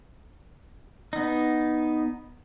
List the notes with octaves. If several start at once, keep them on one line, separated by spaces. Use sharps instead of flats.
B3 D#4